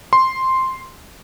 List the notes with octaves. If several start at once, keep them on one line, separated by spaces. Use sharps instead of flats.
C6